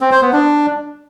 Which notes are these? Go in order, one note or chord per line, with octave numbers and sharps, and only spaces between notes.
C4
C5
B3
D4